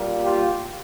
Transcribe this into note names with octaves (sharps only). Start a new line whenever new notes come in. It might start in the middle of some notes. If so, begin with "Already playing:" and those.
Already playing: A#2 G3 A#3
F4 G4